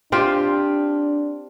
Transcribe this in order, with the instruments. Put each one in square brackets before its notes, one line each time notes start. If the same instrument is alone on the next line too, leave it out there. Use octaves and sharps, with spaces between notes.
[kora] C4 F4 G4 [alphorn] D4